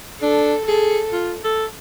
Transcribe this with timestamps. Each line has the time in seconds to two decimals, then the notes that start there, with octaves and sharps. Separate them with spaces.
0.22 D4 A4
0.67 G#4 A4
1.12 F4
1.44 A4